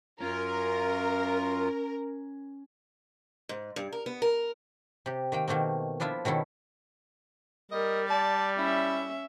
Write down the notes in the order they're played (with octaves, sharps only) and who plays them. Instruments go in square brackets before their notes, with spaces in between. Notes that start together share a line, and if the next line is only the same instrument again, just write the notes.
[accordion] F#2 F4 [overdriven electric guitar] C#4 [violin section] A#4
[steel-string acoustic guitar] G#2
G2
A#4
B3
A#4
[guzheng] C3 G4
D#3 A#3 G5
B2 D#3 A3 A#3 C4
F3 D4 E4 F4 E5
B2 D#3 C#4 E4 A4
[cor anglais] G3 [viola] A#4 [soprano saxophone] D#5
[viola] D5 [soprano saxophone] A5
[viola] C#4 E5 [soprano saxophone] E4